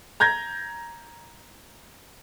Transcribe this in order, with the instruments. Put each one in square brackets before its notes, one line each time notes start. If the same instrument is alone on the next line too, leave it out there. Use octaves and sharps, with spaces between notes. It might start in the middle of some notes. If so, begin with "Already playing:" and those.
[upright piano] A#5 G6 G#6 A#6